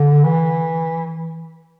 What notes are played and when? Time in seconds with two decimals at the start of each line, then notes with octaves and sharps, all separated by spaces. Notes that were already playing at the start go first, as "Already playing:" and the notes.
Already playing: D3
0.24 E3